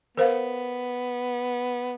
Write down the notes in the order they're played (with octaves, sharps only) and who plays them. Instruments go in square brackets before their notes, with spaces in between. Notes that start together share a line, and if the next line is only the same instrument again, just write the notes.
[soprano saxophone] B3 [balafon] A#4 C5 F5